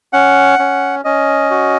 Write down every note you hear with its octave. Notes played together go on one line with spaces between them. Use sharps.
C#4 F#5
C#4
C#4 D#5
F#4